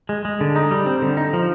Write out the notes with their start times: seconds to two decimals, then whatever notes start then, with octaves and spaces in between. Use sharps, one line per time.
0.09 G#3
0.25 G#3
0.41 D3
0.56 D#4
0.71 G3
0.86 C4
1.02 D3
1.17 D#4
1.33 F3